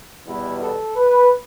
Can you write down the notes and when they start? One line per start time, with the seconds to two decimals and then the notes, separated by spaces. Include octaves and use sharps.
0.25 E2 B2 G3 B3 E4
0.60 A4
0.96 B4